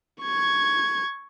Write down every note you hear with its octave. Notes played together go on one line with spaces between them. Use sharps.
C#6 G#6